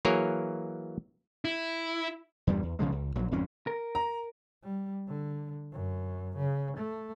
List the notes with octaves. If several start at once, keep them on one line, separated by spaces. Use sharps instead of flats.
E3 F#3 A#3 G#4 A#4 C#5
E4
E2 G2 A#2 G3
E2
B1 C#3 F3 G#3
C#2
A#1 F#3
G#1 F2 D3 C#4
A#4
A#5
G3
D3
F#2
C#3
A3